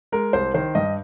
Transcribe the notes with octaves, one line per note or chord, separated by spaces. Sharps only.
G#3 A#4
C2 C5
D#3 C5
G2 D#5